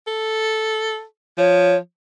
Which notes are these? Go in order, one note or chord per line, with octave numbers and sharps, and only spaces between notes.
A4
F3 C#5